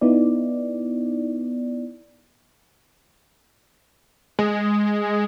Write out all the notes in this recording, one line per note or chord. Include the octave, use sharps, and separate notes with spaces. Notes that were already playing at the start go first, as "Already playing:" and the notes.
B3 D#4 E4 D5
G#3